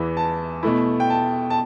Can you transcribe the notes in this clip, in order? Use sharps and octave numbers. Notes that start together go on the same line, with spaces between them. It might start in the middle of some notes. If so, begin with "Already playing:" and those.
Already playing: E2 E3 B3 E4
A5
B2 A3 E4
G5
A5
A5